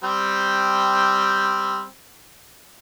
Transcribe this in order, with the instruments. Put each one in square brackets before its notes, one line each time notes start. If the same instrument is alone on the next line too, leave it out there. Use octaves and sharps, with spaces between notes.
[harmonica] G3 C4